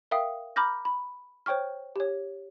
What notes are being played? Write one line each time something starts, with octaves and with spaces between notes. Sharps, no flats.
A#4 E5 F5 G5 D#6
A#5 B5 D6 F6 G6 A#6
B5
C5 C#5 G5 C#6 F6
G4 C#5